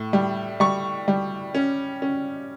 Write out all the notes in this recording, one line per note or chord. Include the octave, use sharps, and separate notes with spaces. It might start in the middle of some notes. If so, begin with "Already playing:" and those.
Already playing: A2
G3
G3 C#6
G3
C#4
C#4